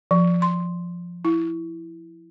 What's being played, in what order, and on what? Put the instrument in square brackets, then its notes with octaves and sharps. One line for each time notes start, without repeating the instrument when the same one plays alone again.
[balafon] F3
C6
E4